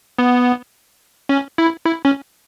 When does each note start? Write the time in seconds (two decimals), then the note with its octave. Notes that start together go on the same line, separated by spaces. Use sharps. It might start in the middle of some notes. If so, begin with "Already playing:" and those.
0.18 B3
1.29 C#4
1.58 E4
1.86 E4
2.05 C#4